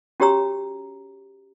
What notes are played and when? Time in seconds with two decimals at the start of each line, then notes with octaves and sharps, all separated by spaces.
0.20 C#4 F#4 G4 C#5 A#5 E6